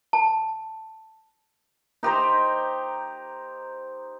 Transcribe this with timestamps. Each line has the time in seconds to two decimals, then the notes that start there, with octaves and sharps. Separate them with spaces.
0.13 A5
2.03 D#4 G4 C5 A#5